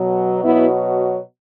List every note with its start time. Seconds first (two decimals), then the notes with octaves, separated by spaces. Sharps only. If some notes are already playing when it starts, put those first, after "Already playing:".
Already playing: B2 F#3
0.44 B2 F#3 B3 E4